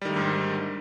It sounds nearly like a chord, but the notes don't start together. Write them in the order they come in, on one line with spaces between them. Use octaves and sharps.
G3 D#3 A3 D3 G#2